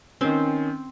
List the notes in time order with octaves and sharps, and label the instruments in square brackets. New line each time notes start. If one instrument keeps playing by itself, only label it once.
[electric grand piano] D#3 C#4 [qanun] C4